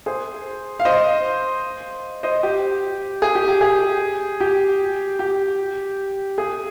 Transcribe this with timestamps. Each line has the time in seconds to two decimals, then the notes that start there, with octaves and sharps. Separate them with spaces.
0.06 G#4 C5
0.80 F5
0.85 C5 D#5
2.23 C5 D#5
2.43 G4
3.22 G#4
3.35 G4
3.48 G4
3.61 G#4
4.40 G4
5.19 G4
6.38 G#4